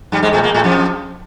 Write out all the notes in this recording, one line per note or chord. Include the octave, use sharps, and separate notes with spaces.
G2 G3
G#2 G#3
A2 A3
A#2 A#3
A2 A3
F2 F3